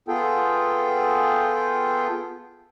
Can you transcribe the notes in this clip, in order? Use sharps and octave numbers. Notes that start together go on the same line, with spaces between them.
B3 F4 G#4 A4 G5